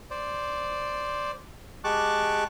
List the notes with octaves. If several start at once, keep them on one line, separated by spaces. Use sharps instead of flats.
C5 D5
G#3 G4 A5 C#6 D6 F#6